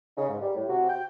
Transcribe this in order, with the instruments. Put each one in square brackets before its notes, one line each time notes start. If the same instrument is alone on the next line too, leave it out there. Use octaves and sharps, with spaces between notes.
[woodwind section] C#3 D#4
G#2
G3
A2
C3 F#4
G5